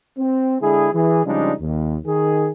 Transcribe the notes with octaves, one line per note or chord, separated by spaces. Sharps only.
C4
D3 G#3 E4 G#4
E3 G#4
C#3 F3 G3 G#3 D4 D#4
D#2
D#3 G#4